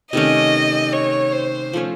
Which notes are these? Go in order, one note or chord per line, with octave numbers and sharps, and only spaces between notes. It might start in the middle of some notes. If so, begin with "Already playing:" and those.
C3 D#3 A3 C#4 D#5
C#5
C5
F3 A3 C#4